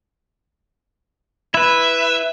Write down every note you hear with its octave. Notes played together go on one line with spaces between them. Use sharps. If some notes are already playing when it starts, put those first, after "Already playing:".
E4 B4 E5